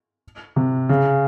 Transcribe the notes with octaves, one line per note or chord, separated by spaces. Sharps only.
C3
C#3